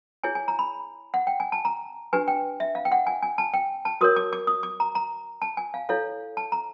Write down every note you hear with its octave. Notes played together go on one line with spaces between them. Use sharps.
E4 G#4 C#5 G#5
G#5
A#5
B5
F#5
G5
G#5
A5
A#5
D4 G4 B4 G#5
G5
E5
F5
G5
F#5
G#5
G#5
A5
G5
A5
F#4 A#4 C#5 D#6
D6
D6
D#6
D6
A#5
A#5
A5
G#5
F5
E4 A4 C#5 F5
A5
A#5